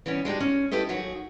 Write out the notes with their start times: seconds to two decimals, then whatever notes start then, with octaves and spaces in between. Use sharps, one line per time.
0.06 E3 G3 B3 C#4
0.25 G#3 D4 D#4 G4
0.40 C#4
0.71 E4 G4 A4 B4 D#5
0.89 D#2 D#3 F#3 F#4 G#4